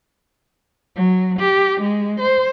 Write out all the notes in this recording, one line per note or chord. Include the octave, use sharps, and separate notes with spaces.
F#3
G4
G#3
C5